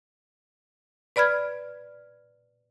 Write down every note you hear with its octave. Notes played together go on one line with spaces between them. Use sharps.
B4 D5 B5 F6 G#6